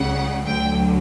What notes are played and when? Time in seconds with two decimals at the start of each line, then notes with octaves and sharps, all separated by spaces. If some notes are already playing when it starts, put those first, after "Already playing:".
Already playing: C#2 C#3 G3 F#5
0.46 D2 D3 F#3 G5